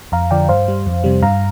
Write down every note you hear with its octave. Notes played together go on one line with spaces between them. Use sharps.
F2 F5 A#5
D3 F3 D5 G5
G2 C5 F5
G3
F2
C3 G3
G2 F5 A#5